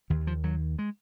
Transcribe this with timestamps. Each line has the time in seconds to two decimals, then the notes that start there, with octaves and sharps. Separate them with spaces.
0.10 D#2 D#3
0.27 F3
0.44 D#2 F#3
0.79 G#3